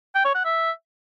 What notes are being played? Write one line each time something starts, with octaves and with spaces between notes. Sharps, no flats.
G5
C#5
F#5
E5